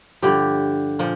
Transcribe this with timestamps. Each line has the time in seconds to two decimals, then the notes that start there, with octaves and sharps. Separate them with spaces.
0.22 G2 D3 F3 G4
0.99 A#2 F3